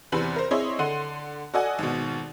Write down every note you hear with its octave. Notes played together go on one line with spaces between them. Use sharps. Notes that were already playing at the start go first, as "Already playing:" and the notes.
E2 C3 C4 B4 F#7
A#4 C5
C4 E4 G#4 C#5 D#5 C6
D3 F#5 C6 D#7
F#4 A4 D5 D#5 F#5 G#5
G#1 B2